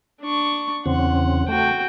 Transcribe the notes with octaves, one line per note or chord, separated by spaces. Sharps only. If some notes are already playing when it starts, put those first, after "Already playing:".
D4 C#6
E2 C#3 C4 F#5
A3 F#4 G5